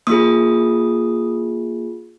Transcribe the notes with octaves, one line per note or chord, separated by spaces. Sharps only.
A#3 F4 G#4 D#6